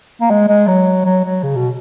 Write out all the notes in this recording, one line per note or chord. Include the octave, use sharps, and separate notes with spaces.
A#3
G#3
G#3
F#3
F#3
F#3
C#3
B2